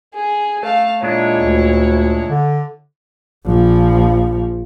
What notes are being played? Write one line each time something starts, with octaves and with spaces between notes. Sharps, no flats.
G#4
A3 F5 A5
A#2 G#3 D4 E4 C#5
D2
D3
A#1 F3